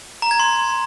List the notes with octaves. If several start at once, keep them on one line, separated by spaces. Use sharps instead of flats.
A#5
G#6
C6